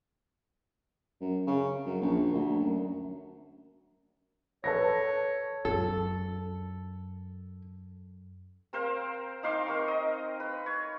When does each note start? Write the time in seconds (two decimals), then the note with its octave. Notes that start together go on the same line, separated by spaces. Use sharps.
1.21 F#2
1.47 C#3
1.85 F#2
2.01 A#1
2.32 D2
2.59 F#2
4.64 A4 B4 C#5 A#6
5.65 F#2 A4
8.73 C4 A#4 C5 F5
9.43 D#4 F5 C6 D6
9.66 C4 A#4 C#6
9.88 D#5
10.40 B4
10.66 C#5